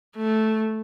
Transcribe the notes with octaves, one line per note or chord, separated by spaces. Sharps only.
A3